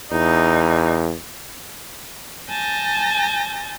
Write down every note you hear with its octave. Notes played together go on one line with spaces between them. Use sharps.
E2 D#4
G#5 A5 G6 A6 A#6